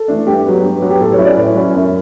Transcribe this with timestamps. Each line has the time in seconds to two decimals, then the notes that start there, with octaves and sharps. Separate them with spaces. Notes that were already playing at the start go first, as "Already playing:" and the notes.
Already playing: A4
0.08 E3 A3 D4
0.27 G2 G4
0.46 F#3 B3
0.63 G2
0.82 F#3 B3
0.90 G4
1.00 A2 A4
1.13 C#5
1.19 F#3 C#4 E4
1.25 D5
1.37 A2 B4
1.55 F#3 C#4 E4
1.74 F#2